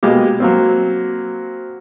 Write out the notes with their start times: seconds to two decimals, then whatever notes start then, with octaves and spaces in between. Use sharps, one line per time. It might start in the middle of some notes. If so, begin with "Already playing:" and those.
0.03 B2 G#3 A#3 G4
0.40 F#3 A#3 C4